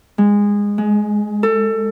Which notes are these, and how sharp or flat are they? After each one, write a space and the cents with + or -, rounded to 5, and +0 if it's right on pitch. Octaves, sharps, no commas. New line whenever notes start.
G#3 -20
G#3 +15
A4 +25